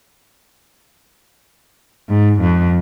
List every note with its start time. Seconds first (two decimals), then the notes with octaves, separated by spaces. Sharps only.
2.09 G#2
2.41 F2